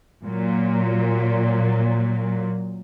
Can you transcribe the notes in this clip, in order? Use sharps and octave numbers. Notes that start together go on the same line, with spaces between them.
A#2 F#3